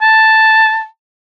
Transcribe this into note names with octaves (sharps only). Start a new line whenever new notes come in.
A5